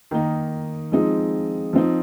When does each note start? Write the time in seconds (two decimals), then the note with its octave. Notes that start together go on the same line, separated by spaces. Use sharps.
0.11 D#3 A#3 D#4
0.92 F3 G#3 C4 D#4
1.73 F3 C4 D#4